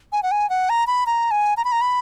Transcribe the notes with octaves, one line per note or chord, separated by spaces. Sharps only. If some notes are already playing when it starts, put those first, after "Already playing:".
G#5
F#5
G#5
F#5
A#5
B5
A#5
G#5
A#5
B5
A#5
B5